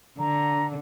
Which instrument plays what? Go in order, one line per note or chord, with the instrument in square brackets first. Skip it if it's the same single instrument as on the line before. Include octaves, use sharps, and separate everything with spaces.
[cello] D3 [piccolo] A#5